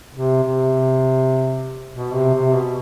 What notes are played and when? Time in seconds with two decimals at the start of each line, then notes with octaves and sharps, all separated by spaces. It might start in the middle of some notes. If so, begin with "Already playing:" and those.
0.14 C3
0.43 C3
1.94 B2
2.14 C3
2.34 C3
2.54 B2